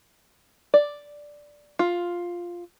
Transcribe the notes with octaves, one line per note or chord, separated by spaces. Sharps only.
D5
F4